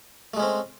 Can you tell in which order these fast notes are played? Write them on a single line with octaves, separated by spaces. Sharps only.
A3 G#3 C#4 C4